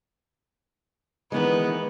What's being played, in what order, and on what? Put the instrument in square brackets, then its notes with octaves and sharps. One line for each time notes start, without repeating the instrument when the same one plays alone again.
[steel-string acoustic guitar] D#3 E3 G#3 [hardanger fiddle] B3